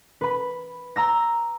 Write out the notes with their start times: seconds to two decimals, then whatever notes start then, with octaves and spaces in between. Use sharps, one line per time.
0.21 B4 B5
0.96 A#5 E6 A#6